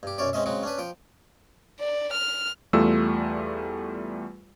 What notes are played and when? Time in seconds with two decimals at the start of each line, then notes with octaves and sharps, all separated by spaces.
0.03 G2 G4
0.18 B1 F#2 C#4 C#5 D5
0.33 G#3 C4 C#4 D#5 E5
0.46 C#3 F#3 G#3 C4 F#4
0.63 C#4 D4 B4
0.78 F3 G5
1.80 D5
2.13 F6
2.73 E2 G3 A3 F4 E6